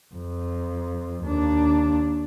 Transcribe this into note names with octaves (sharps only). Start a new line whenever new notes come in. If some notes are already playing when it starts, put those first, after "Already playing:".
F2
D#2 D4